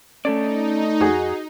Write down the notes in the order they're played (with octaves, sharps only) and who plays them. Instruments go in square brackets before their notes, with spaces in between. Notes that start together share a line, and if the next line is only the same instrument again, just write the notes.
[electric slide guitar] A3 A4 D5 [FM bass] C#4 [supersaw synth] D#4
[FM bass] F2 [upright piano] F#4 G#4